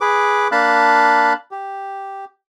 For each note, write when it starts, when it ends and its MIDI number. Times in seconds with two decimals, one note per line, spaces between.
0.01 0.48 68
0.01 0.48 71
0.01 0.48 86
0.52 1.33 58
0.52 1.33 62
0.52 1.33 77
0.52 1.33 81
0.52 1.33 83
0.52 1.33 90
1.51 2.25 67